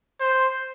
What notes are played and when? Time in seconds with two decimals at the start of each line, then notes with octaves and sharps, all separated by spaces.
0.20 C5